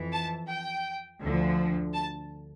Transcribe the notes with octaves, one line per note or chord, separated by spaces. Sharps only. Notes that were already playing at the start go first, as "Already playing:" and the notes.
Already playing: F2 E3
A5
G5
D2 D3 F3
A5